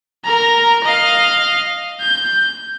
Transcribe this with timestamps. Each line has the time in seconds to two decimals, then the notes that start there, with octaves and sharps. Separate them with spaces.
0.25 A#4 A#5
0.84 D#5 F5
2.01 G6